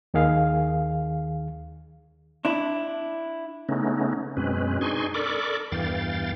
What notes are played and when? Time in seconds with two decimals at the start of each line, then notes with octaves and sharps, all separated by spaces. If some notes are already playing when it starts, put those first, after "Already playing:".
0.14 D#2 D#3 G#4 F5
2.45 D4 E4
3.69 C#3 A3 B3 C#4 D#4
4.37 F#2 B2 G#3 C4 C#4 B4
4.81 D4 D#4 G#4 G#5 C6 C#6
5.14 A4 A#4 D5 B5 C#6 D6
5.72 E2 G2 E3 F5 G5 A6